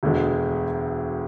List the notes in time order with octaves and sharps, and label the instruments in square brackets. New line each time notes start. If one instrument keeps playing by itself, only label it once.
[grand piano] E1 D2 D3 G#3